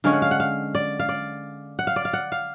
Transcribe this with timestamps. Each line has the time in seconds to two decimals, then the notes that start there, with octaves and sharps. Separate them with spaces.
0.04 D3 G#3 C#4 F5
0.13 F#5
0.22 F5
0.31 F#5
0.40 F5
0.75 D5
1.00 F5
1.09 D5
1.79 F#5
1.87 F5
1.96 D5
2.05 F5
2.13 F#5
2.32 F5